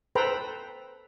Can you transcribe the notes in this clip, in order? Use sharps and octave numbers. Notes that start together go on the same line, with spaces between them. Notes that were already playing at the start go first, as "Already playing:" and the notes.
A4 B4 C5 G5 A#5 B5